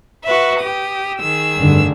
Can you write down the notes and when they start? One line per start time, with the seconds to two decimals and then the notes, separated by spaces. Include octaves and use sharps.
0.25 F#4 B4 E5
0.59 G4 D#6
1.19 D#3 G#4 E6
1.58 F1 G2 D3